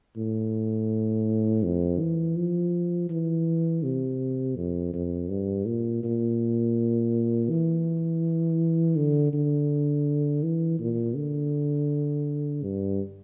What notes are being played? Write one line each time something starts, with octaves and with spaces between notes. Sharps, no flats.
A2
F2
E3
F3
E3
C3
F2
F2
G2
A#2
A#2
E3
D3
D3
E3
A#2
D3
G2